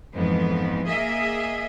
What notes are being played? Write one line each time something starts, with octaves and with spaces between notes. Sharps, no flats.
F2 G#2 E3 B3
A#3 G#4 D#5 E5